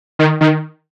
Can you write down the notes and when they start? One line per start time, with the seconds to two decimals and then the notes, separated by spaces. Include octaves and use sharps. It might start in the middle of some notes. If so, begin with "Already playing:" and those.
0.19 D#3
0.41 D#3